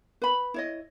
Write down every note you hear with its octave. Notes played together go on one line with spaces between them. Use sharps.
B4 B5
E4 C#5 D#5